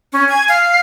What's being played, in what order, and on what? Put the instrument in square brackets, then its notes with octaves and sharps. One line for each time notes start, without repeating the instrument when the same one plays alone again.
[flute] C#4
G#5
F5